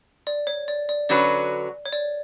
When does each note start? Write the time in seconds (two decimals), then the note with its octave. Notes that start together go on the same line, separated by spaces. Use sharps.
0.27 D5
0.47 C#5
0.68 D5
0.89 D5
1.09 D3 F#3 C#4 F#4 B4 D5
1.86 C#5
1.92 D5